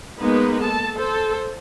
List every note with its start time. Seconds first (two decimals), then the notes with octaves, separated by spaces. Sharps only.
0.20 G#3 A#3 B3 D#4 B4
0.62 A4 A5
0.96 A4 C5